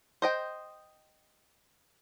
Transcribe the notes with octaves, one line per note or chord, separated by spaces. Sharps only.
C5 D#5 G5